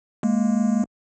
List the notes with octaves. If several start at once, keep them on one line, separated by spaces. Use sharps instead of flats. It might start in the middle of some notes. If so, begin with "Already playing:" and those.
G#3 A#3